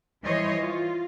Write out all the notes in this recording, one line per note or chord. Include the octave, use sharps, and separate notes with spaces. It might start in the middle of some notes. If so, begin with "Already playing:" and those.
E3 G3 C5 C#5 D#5
F4